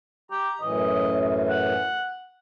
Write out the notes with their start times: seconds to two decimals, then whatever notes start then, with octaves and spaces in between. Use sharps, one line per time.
0.31 G4 A#5
0.61 F#2 A2 E3 D#5
1.50 F#5